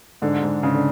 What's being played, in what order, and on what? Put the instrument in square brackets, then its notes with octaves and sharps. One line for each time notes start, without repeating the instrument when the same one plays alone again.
[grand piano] G#2 [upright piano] D3
[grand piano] G#2
[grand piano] G#2 [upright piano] C#3
[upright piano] D3